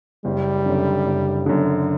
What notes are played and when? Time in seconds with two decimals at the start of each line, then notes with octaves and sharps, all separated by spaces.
0.25 F#1 G3
0.66 F#2 D3
1.06 F#1
1.46 F#2 D3